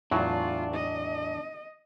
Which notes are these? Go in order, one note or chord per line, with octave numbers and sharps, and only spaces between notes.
E2 A2 F#3 D4 F4
D#5